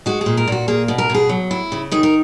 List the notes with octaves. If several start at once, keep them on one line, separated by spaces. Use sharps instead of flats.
G#3 F#4
G#4
A#2
A#4
A#2 F#4
A#3 G#4
B2
A#4
B2 G#4
F#3
E4
C#3
D#3 G#4
A#4